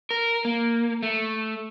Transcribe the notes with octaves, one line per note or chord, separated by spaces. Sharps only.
A#4
A#3
A3